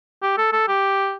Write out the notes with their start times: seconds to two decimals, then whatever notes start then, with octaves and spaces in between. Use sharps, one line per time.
0.23 G4
0.37 A4
0.53 A4
0.68 G4